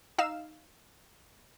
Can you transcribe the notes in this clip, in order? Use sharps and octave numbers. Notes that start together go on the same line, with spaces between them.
D#4 F5 E6 E7